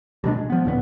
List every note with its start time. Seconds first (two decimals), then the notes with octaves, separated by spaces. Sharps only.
0.24 A1 B2 G#3 D4
0.38 G#3
0.50 F3 B3
0.65 C#2 A2 D3 B3